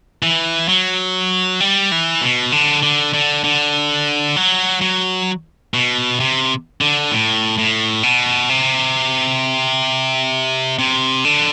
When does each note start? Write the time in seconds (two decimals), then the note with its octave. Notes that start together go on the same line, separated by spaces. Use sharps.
0.23 E3
0.68 F#3
1.60 G3
1.91 E3
2.22 B2
2.52 D3
2.83 D3
3.14 D3
3.44 D3
4.36 F#3
4.81 F#3
5.74 B2
6.20 C3
6.81 D3
7.12 A2
7.58 A2
8.03 B2
8.49 C3
10.79 C3
11.25 D3